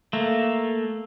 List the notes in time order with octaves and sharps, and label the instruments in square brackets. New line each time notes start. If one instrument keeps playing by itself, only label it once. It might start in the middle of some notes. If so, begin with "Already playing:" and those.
[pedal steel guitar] A3 A#3